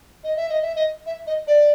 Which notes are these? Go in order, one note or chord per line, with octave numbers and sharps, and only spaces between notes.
D#5
E5
D#5
E5
D#5
E5
D#5
D5